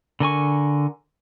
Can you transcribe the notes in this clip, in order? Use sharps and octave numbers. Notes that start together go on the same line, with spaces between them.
D3 A#4 G#5 C#6